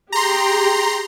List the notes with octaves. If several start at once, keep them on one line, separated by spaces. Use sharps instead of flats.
G4 G#4 G5 A#5 C6